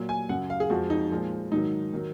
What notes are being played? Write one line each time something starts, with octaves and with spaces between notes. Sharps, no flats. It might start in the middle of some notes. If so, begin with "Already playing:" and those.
Already playing: A#2 F#3
G#5
F#2 C#3 F#3 F#5
F5
G#4
F2 F3 G#3 F#4
D#4
A#2 F3 G#3
G#2 D#3 F#3 D#4
D#3 F#3